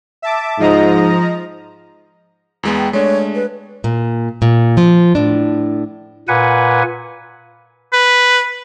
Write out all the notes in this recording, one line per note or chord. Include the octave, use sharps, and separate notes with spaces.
E5 A5 D6
G#2 F3 D#5 A#5
E2 G#3 B3
G5
G#3 A3 D4 C#5
B4
A#2
A#2
F3
A2 D4
A#2 B4 F#5 G#5
B4